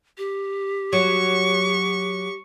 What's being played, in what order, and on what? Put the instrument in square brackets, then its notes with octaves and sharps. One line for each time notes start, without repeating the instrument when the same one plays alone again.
[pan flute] G4
[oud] F#3 [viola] C#6